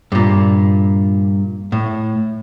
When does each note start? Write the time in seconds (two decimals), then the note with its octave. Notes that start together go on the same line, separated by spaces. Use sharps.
0.12 G2 A#2
1.72 A2